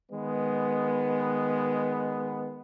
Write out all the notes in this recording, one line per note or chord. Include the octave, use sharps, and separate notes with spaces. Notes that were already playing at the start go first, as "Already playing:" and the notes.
D#3 G#3 B3